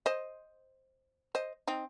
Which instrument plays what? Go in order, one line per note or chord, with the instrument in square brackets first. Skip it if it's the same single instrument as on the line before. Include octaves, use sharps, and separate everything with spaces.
[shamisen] C5 D#5
C5 D#5
C4 D#4